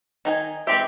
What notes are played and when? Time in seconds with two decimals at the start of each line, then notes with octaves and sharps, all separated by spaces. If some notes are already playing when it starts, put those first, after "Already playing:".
0.25 D#3 D#4 G#5
0.67 E3 G#3 C4 G4 E5